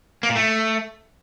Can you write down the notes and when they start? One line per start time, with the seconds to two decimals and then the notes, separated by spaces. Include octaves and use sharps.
0.23 A#3
0.29 A#2
0.36 A3